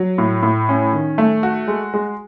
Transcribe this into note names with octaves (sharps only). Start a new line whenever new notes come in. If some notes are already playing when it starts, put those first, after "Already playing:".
Already playing: F#3
A2
A2
C#4
D#3
A3
F#4
G#3
G#3